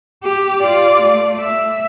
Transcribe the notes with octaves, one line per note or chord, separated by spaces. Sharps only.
G4
F4 D5
A3
E5